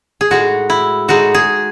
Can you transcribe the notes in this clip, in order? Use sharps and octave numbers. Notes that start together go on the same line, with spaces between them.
G#4
A2 G#3 D#4 F#4
E4
A2 G#3 D#4 F#4
G#4